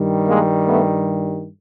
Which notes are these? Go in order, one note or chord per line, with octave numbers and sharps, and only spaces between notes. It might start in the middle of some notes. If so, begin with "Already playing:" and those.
Already playing: G2 D#3 G3
G#3 A#3
A3 B3